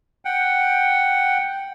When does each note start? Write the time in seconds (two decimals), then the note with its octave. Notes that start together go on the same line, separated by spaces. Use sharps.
0.25 F#5 G5